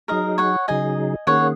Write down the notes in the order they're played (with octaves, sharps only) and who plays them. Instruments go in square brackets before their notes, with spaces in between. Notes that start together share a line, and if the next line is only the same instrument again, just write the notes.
[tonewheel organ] F#3 D#4 G#4 [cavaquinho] A#4 D#5
[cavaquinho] C#5 F#5
[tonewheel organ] C#3 F#3 D#4 G#4 [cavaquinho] D#5 G#5
[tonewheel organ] D#3 A#3 C#4 G#4 [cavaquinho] C#5 F#5